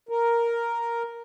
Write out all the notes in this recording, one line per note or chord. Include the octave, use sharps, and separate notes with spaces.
A#4